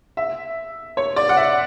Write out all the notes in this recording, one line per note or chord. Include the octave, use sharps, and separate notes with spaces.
E5
C#5
D5
F#5
E5